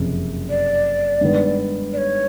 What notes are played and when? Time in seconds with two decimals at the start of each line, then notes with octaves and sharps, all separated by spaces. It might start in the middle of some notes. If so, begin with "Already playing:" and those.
Already playing: F#1 F2 C3
0.50 D5
1.21 G2 D#3 G#3 B3
1.93 D5
1.98 C#5